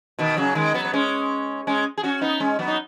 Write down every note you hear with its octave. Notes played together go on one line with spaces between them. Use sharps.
B2 D#3
C#3 F#3
D#3 G#3
F#3 B3
B3
G#3 C#4
G#3 C#4
G#4
C#4 F#4
B3 D#4
G#3 C#4
F#3 B3
D#4